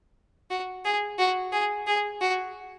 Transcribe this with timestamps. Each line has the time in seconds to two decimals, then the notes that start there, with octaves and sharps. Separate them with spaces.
0.50 F#4
0.85 G#4
1.19 F#4
1.52 G#4
1.87 G#4
2.21 F#4